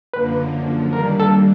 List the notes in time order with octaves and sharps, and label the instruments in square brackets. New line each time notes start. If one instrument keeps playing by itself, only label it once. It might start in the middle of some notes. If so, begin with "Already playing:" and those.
[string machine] F#2 D3 F3 A#3 [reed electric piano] B4
[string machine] D#3 G3 A#3 D4 [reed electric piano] A#4
[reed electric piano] A4